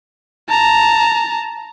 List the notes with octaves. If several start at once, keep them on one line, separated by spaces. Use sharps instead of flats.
A5 A#5